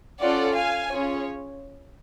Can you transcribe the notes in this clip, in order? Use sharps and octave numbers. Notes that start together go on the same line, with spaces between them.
C#4 F4 A4 D5 F#5
F5 G#5
C#4 F4 G#4 C#5